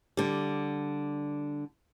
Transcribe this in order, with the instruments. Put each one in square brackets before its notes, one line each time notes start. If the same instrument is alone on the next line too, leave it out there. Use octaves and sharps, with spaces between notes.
[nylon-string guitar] D3 G3